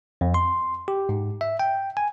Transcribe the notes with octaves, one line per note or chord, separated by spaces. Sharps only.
F2
C6
G4
G#2
E5
G5
G#5